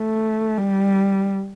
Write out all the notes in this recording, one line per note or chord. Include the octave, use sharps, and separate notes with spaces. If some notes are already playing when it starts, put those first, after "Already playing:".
Already playing: A3
G3